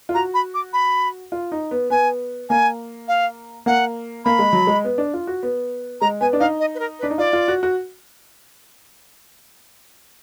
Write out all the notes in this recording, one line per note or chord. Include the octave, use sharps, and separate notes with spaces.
F4
F#4 A#5
B5
D6
B5
F4
D#4
B3
B3 G#5
A#3 G#5
F5
A#3 F#5
A#3 B5
G#3
F#3
G#3
B3
D4
F4
F#4
B3
G#3 A#5
B3 G#5
D4
D#4 F5
D#5
B4
A#4
B4
D4
D#4
F4 D5
F4
F#4
F#4